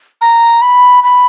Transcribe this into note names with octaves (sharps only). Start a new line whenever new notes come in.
A#5
B5
B5